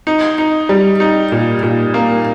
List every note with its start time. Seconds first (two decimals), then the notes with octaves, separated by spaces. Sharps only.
0.07 D#4
0.38 D#4
0.69 G3
1.00 D#4
1.32 A#2
1.63 A#2
1.94 A#3